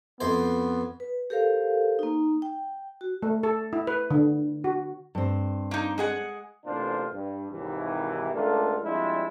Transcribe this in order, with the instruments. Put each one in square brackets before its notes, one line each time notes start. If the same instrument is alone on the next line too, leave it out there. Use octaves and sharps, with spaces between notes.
[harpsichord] F2 C5 [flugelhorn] B3
[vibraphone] B4
G4 A4 A#4 C5 F5
A#3 D#4
G5
F#4
[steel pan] A3
A4
E4
B4
D3
F#4
[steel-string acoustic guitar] G2 C4
[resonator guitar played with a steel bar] A#3 D#4
G#3 G#4 F#5
[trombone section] A1 C3 A#3 D4 F4 C5
G2
G#1 D#2 C3 E3
C#2 A3 A#3 D4 F4 A4
F3 G3 G#3 C4 D4 E4